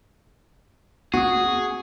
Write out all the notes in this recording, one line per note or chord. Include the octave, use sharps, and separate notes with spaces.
A#3 C4 F#4 G#4 C#6 D#6